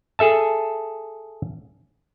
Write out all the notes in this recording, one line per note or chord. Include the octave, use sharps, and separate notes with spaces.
G#4 A4 E5 A5